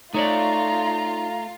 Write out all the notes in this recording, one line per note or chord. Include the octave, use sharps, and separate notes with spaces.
A3 D#4 F4 C#5 D5 A#5